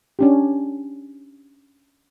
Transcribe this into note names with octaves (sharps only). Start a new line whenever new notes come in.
C#4 D4 G4